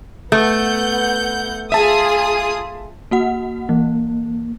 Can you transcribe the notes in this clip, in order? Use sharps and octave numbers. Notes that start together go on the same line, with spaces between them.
A3 B3 F#5 G6
F4 G#4 E5 A5 D#6
A#3 F#4 F#5
E3 A#3